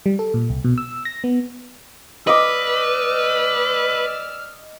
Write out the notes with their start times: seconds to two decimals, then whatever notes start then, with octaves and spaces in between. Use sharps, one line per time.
0.06 G3
0.19 A4
0.34 A#2
0.50 C2
0.64 B2
0.78 E6
1.05 A#6
1.24 B3
2.27 B4 D5 D#5 D6 E6 F6